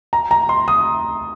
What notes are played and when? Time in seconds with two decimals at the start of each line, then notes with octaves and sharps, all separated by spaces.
0.13 A#5
0.31 A#5
0.49 C6
0.68 D#6